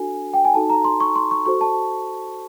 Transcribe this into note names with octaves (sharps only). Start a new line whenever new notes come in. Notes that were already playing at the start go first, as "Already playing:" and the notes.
Already playing: D4 F#4 A4 G#5
G5
G#5
D#4 F#4 A4 A5
A#5
C6
C#6
C6
C#6
F#4 A4 C5 C#6
A5